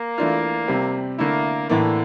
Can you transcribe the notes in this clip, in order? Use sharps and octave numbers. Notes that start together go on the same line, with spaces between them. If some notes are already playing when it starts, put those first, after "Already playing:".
Already playing: A#3
E3 A3 D4 F4
C3 G3 C4
D3 A3 A#3 E4
A2 D3 E3 A#3